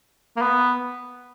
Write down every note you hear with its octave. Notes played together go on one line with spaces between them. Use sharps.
A#3
B3